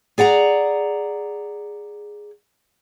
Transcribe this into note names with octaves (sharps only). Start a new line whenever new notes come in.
G#4 D5 F#5 A#5